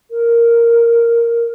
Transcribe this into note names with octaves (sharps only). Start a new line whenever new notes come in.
A#4